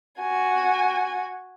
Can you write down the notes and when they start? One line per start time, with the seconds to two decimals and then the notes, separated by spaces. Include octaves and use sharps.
0.19 F#4 G#5